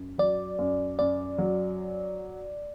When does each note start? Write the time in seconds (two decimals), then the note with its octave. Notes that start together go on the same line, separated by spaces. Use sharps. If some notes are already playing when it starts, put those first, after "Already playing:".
Already playing: F#2
0.18 F#3 D5
0.59 F#2
0.99 F#2 D5
1.38 F#3